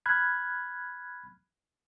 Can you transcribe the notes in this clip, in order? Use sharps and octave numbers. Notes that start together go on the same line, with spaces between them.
B5 F6 F#6 G#6